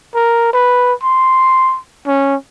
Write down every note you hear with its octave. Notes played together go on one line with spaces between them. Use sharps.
A#4
B4
C6
C#4